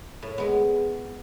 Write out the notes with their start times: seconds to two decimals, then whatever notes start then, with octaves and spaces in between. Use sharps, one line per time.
0.22 A2
0.38 G#3 B3